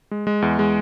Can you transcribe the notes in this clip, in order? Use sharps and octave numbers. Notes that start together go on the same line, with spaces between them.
G#3
G#3
E2
G#3